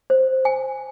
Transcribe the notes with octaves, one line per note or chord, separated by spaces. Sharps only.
C5
G#5